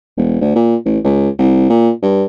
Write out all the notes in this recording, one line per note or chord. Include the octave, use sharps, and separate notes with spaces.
E1
D2
A#2
A1
C#2
C2
A#2
G2